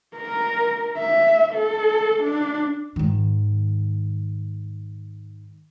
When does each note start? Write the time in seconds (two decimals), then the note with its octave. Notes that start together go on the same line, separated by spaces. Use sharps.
0.17 A#4
0.99 E5
1.54 A4
2.24 D4
2.96 G#2 D#3